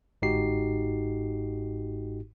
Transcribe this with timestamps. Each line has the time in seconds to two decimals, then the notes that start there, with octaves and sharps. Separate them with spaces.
0.22 G1 G#2 D#4 F#4 G4 C7